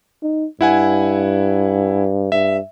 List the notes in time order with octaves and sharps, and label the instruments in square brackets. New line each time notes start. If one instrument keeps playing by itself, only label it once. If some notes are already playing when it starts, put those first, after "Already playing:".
[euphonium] D#4
[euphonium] G2 [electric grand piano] E4 F#5 G#5
[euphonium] G2 [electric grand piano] E5